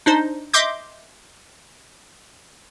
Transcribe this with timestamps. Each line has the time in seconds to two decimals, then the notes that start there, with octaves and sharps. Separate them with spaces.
0.06 D4 D#4 C5
0.53 D#5 E5 C6 D6 G6